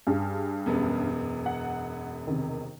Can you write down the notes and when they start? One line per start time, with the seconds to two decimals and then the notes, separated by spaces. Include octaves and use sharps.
0.07 G2 G#4
0.66 E1 F#2 B3
1.46 F#5
2.27 C3 D#3